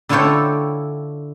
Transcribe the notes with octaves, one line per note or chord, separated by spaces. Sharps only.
D3 E4 F4 A4 C#5 G5